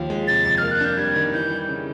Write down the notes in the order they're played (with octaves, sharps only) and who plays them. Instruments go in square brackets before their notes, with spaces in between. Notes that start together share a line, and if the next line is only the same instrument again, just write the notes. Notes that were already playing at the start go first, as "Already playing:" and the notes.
Already playing: [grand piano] D#2 F3
G#3
[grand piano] C3 [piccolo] A6
[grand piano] F2
[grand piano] A#3 [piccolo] F6
[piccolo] F#6
[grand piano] D4 [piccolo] G6
[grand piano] G3 [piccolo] G#6
[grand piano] D#3
[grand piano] E3 [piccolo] G6
[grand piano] G3
C#3